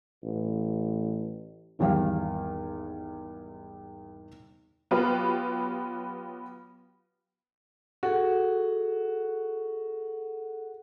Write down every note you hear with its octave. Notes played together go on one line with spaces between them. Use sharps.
A1
G#1 E2 G3 F5
F#3 B3 F4 G4 B4
F#4 G#4 A4